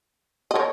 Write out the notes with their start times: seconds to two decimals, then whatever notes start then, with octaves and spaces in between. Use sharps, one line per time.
0.51 D#5
0.55 A#4 C#5